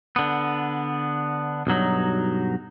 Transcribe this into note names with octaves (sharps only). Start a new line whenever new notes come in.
D3 B3
B1 G2 F#3 D#4